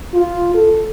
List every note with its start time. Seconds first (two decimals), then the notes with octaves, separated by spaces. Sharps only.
0.13 F4
0.55 A4